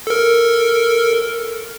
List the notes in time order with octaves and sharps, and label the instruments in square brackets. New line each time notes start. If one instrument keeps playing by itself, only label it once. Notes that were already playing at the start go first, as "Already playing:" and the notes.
[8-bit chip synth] A4 A#4